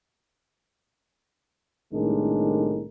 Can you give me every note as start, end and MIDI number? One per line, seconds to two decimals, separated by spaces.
1.93 2.88 36
1.93 2.88 45
1.93 2.88 51
1.93 2.88 56
1.93 2.88 62
1.93 2.88 70